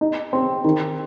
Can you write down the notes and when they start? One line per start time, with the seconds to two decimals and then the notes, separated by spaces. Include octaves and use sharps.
0.01 D#4
0.33 C4
0.65 D#3